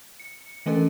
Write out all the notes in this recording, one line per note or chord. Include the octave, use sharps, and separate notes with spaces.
C#7
E3 A3 C#4 A4 A#4